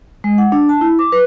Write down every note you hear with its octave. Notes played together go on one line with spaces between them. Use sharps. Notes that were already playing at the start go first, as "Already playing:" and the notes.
G#3
F#5
D4
A5
E4
D6
B4